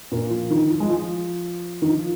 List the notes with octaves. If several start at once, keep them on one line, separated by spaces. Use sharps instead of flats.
A#2 A#3
F3
D#3
F3
G#3
F3
D#3
F3